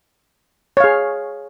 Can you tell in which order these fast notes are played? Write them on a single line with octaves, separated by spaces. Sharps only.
C#5 F5 G#4